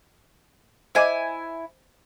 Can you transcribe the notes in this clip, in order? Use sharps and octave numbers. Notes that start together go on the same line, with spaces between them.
E4 C5 D#5 G#5 D6